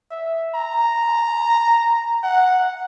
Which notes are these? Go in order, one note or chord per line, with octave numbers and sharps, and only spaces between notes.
E5
A#5
F#5